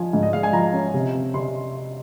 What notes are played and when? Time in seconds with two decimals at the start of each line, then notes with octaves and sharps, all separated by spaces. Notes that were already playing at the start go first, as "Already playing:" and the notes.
Already playing: F3 G#5
0.13 G#2
0.23 D#5
0.33 G#3 F5
0.43 G#5
0.53 F3 A#5
0.73 C#4
0.94 C3
1.14 C4
1.34 C3 C6